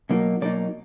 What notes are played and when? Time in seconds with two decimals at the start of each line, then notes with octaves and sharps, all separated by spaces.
0.09 B2 F#3 A#3 D#4
0.41 B2 F#3 A#3 D#4 D5